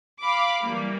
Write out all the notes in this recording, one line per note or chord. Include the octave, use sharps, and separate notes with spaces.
F5 B5 D6
E3 G3 A#3